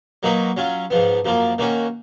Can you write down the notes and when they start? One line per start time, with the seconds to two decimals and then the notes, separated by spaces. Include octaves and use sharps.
0.23 F#3 A#3 D#4 F#4 B4
0.57 F#3 C#4 F4
0.90 G#2 F3 B3
1.25 F#2 F3 A#3 F4
1.58 D#3 A#3 C#4 F#4